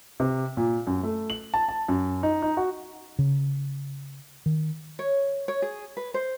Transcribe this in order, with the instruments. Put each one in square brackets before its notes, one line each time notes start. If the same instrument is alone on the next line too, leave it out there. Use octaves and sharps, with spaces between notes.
[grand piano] C3
A#2
F#2
A3
F#7
A5
A5
F#2
D#4
D#4
F#4
[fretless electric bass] C#3
D#3
[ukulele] C#5
C#5
G#4
B4
C5